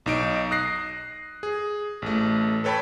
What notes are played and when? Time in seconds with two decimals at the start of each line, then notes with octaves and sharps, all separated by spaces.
0.06 B1 D#4 D7
0.51 D#6 F#6 A#6 C7
1.43 G#4
2.02 A1 A3
2.64 A4 B4 C#5 G5 A5 B5